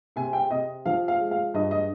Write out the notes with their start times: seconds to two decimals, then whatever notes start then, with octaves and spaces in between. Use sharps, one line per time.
0.16 C3 G#5
0.33 G5
0.51 C3 D#5
0.86 F3 F5
1.08 F5
1.20 G#3
1.31 F5
1.54 G2 D#5
1.71 D#5